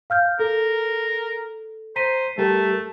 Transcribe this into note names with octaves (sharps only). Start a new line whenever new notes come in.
F5 F6 G6
A4 A#4
C5 A#5 B6 D#7
G3 A3 G4 A#4